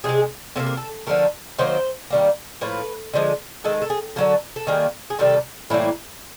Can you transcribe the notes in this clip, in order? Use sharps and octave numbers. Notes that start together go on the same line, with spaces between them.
C3 E3 G#3 G#4
C3 F3 A#3 A4
A#4
A4
D3 F3 A3 A#4
D#3 F#3 A#3 C5
D#3 G3 A#3
A2 F3 A#3 B4
D3 F3 G#3
D#3 G#3 A4
A4
G#4
D3 F#3 A#3 A4
A4
D#3 G3 A#3 G#4
G#4
C3 D#3 G3 A4
A2 E3 G3 A#3 E4